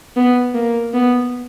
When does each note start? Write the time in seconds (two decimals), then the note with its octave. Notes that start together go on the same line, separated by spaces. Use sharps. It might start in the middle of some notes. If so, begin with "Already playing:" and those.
0.17 B3
0.55 A#3
0.94 B3